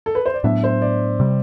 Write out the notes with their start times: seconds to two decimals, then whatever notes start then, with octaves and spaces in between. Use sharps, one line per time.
0.06 A4
0.15 B4
0.26 C5
0.34 D5
0.44 A2 F#3 B3 D4 E5
0.64 C5
0.82 D5
1.20 C3 G3